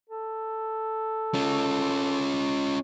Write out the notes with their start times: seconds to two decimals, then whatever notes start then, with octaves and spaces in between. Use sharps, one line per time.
0.10 A4
1.34 C#4 F4